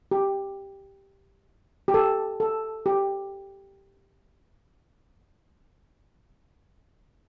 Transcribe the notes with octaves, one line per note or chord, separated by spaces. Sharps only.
G4
G4
A4
A4
G4